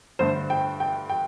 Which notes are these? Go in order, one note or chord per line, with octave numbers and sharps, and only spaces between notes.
G2 D3 A3 D4 C5
G5
G5
G5